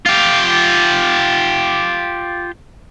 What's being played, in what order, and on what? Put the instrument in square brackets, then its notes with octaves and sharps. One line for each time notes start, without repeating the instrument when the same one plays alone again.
[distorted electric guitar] F4 G4